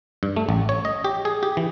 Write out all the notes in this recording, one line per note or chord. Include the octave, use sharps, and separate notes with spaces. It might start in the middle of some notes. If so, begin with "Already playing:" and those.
G2
A3
A1
C#5
D#5
G4
G#4
G4
E3